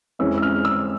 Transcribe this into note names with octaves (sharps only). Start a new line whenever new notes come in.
F2 E3 G#3 C#4 E6
E6
F6
E6